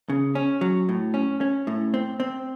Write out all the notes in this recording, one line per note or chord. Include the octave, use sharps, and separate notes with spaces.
C#3
C#4
F#3
A2
C#4
C#4
A2
C4
C4